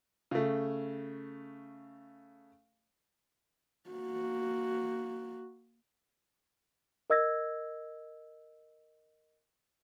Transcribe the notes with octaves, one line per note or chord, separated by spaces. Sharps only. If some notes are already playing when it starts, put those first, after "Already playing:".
C#3 A3
A#3 F#4
A#4 D#5 E6 G#6 A#6